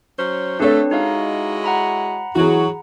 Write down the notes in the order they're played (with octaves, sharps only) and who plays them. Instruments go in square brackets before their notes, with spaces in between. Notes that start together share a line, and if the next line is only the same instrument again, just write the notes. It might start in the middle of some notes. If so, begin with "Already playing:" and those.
[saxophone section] F#3 C#4 C5
[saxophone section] A3 [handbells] C4 D4 B4 [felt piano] A4 C#5
[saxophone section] G#3 E4 F#4 [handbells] D#4 F5
[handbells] F#5 A#5 B5
[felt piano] E3 G#4 [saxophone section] F#3 F#4